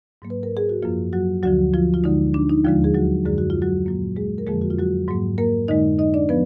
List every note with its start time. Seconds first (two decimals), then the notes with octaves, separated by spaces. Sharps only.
0.22 G#2 F#3 A#3
0.30 B4
0.43 A#4
0.57 G#4
0.69 F#4
0.83 F#2 F3 A#3 F4
1.13 F#3 F#4
1.43 D2 D3 F3 F#3 F#4
1.74 F3 F4
1.94 F4
2.04 D2 D3 G#3 D#4
2.34 D4
2.49 D#4
2.64 D#2 D3 F3 G#3 F4
2.84 G#4
2.95 F#3 F#4
3.25 F#2 D3 G#3 G#4
3.38 F#4
3.50 F4
3.62 F#3 F#4
3.86 A#2 F#3 A#3
4.16 G#3 G#4
4.38 A#4
4.47 F2 D3 F3 G#3 A#3 G#4
4.61 F#4
4.70 F4
4.79 F#3 F#4
5.08 G#2 F#3 A#3
5.38 A#3 A#4
5.68 F2 D3 G#3 D#4 D#5
5.99 D#4 D#5
6.14 D4 D5
6.29 F3 B3 B4